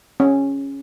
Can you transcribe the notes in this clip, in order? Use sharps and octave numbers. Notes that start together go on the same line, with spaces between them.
C#4